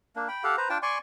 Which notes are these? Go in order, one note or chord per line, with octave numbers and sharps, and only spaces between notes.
A#3 D4
G5 B5
G4 A4 F5 F#5
B4 C5 A#5
D4 F4 G5 A5
D5 G#5 C6 C#6